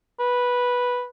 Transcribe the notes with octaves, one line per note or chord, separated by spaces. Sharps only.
B4